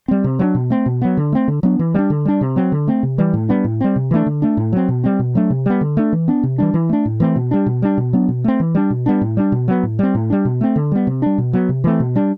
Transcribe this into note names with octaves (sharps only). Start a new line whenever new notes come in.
G3 C4
C3
F#3 B3 D4
B2
A3 C4
B2
F#3 B3
D3
A3 C4
D3
F#3 B3 D4
E3
G3 B3 D4
D3
G3 D4
C3
F#3 C4
D3
A3 C4
C3
E3 G3
A2
G3 B3 D4
A2
G3 C4
C3
E3 A3 D4
D3
A3 D4
A2
F#3 C4
B2
G3 C4
B2
F#3 A3 D4
C3
G3 B3
D3
A3 D4
E3
B3 D4
C3
E3 G3 D4
E3
A3 D4
A2
E3 A3 C4
B2
G3 D4
B2
G3 D4
B2
F#3 B3 D4
B2
A3 C4
E3
G3 D4
B2
G3 B3 D4
A2
G3 D4
B2
F#3 B3
A2
G3 C4
A2
G3 D4
B2
A3 C4
D3
G3 B3
C3
G3 D4
B2
F#3 B3
C3
E3 A3 C4
B2
G3 D4